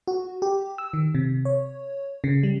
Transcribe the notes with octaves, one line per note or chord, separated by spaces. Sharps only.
F#4
G4
E6
D#3
C3
C#5
C#3
G3